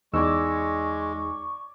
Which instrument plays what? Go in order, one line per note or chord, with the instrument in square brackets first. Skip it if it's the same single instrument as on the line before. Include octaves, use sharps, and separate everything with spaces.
[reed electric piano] E2 D#4 E6 [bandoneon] G#3 [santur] C#5 D5 D6 [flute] C#6